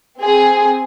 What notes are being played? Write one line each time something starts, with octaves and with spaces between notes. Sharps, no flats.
C4 G#4